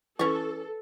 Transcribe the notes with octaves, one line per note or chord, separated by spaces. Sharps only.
E3 C#4 A4 B4 C#6